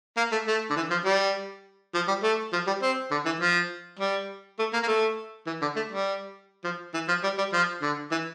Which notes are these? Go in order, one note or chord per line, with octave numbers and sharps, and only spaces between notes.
A#3
A3
A3
D3
E3
F3
G3
F3
G3
A3
F3
G3
C4
D3
E3
F3
G3
A3
A#3
A#3
A3
E3
D3
A3
G3
F3
E3
F3
G3
G3
F3
D3
E3